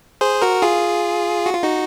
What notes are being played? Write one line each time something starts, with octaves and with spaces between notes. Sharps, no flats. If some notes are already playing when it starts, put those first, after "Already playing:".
G#4 C5
F#4 A#4
F4 G#4
F#4
F4
D#4 F#4